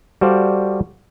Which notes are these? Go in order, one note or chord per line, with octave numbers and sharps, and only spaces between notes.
G3 F#4 A4 C5 D5 F5